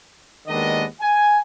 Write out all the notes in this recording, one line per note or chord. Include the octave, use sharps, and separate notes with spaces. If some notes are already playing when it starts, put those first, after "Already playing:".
D#2 D#3 G#3 B3 D4 D#5
G#5